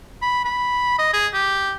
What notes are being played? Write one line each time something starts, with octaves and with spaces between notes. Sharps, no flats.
B5
B5
D#5
G#4
G4